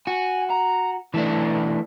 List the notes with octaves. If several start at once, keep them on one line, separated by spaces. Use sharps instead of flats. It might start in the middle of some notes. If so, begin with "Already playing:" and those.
F#4 G#5
A#5
B1 E3 A3 D4 A5